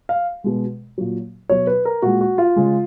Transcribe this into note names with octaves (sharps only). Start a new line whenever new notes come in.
F5
B2 G#3
A#2 F#3
B2 F#3 C#5
B4
A#4
A#2 G#3 F#4
F#4
F4
C#3 G#3